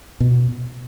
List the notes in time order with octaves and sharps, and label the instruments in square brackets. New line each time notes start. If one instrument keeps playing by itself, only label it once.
[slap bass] B2